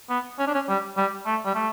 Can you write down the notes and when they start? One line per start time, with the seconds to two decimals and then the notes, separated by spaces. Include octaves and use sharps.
0.10 B3
0.39 C#4
0.47 D4
0.54 C#4
0.69 G3
0.97 G3
1.26 A3
1.45 G3
1.55 A3